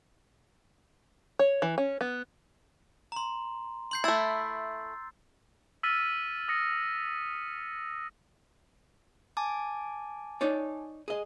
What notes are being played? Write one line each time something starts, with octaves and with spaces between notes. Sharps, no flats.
C#5
E3
C#4
B3
A#5 C6
C6 G6 C7
A3 E4 E6 A6
E6 F6 A6 B6 D#7
D#6 A#6 C#7
G#5 A5 D6
D#4 C#5 D5
G#4 D#5